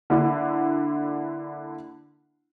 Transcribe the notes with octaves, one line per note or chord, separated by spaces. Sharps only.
D3 A#3 D4 E4